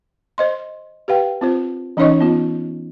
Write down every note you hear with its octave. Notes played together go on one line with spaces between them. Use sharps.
C5 D#5 C6
G4 B4 F5 G5
C4 F4 C5
E3 C#4 D#4 C#5 D#5 C#6
B3 F4